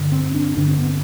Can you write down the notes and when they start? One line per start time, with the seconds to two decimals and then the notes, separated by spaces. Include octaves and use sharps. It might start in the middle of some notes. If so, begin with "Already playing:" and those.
Already playing: G2 D3
0.12 C4
0.34 D4
0.57 G2 D3 D4
0.67 C4
0.78 B3